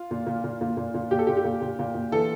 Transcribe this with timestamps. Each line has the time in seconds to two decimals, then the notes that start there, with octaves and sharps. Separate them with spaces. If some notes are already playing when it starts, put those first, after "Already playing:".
Already playing: F4
0.11 A#2
0.26 A#2
0.44 A#2
0.61 A#2
0.77 A#2
0.94 A#2
1.11 A#2 G4
1.19 A4
1.27 A#2 G4
1.37 G4
1.45 A#2
1.61 A#2
1.79 A#2
1.95 A#2
2.12 E3 A4